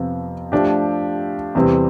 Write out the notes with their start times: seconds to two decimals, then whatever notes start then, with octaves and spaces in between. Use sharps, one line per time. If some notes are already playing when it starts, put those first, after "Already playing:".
Already playing: F2 C3 F3 B3
0.52 F3 A3 D4 G4
1.55 E2 C3 E3 G3 C4